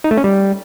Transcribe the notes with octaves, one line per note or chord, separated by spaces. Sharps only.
D#4
A3
C#4
G3